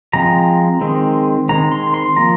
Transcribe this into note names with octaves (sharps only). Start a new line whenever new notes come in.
F3 G#3 C4 A#5
D#3 G#3 C4
D#3 G#3 C4 A#5
C6
C6
F3 A#3 A#5